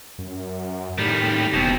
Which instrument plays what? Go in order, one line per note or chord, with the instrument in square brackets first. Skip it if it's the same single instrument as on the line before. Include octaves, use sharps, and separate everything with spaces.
[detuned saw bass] F#2
[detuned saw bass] A2 [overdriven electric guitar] D#3 G3
[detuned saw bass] E1 [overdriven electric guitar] B2 C4